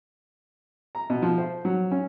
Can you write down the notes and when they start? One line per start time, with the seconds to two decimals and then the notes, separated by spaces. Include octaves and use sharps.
0.95 A#5
1.10 B2
1.22 F3
1.38 C5
1.65 F#3
1.91 C#4